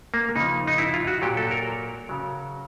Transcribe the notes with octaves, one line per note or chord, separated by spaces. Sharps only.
A#3
C#3 F3 D#4
D#4
E4
F4
F#4
A#2 F#3 G4
A4
A#4
C#3 F#3